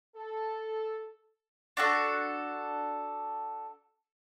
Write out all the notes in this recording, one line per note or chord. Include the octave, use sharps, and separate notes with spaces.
A4
D4 F#4 A4